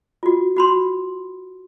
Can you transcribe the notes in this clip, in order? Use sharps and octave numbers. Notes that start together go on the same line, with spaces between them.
F4 F#4
F#4 B5 C6